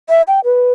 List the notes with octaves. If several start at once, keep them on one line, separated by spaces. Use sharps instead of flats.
E5
G5
B4